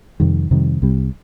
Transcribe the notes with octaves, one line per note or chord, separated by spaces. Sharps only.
F2 C3 D#3 G3
F2 C3 D#3 G3
C2 C3 G3